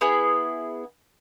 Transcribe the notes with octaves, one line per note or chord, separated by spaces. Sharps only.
B3 E4 G#4